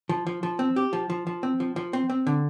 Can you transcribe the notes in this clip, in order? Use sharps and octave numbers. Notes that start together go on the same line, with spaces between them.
F3
F3
F3
C4
G4
F3
F3
F3
C4
F3
F3
C4
C4
D3